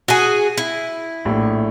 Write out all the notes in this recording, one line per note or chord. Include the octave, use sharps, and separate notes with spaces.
F#4 G#4
E4
A#1 A2